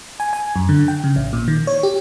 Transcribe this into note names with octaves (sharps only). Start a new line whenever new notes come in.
G#5
G#5
F#2
D3
G5
C#3
A1
A#2
D#3
C#5
G4